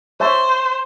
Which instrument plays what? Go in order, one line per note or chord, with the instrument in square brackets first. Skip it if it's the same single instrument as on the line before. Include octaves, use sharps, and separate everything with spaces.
[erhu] C5 [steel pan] C#5 E5 A5